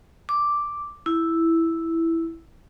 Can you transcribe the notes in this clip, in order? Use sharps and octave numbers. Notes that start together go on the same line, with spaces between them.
D6
E4